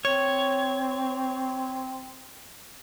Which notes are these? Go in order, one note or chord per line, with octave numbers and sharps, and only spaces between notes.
C4 C#5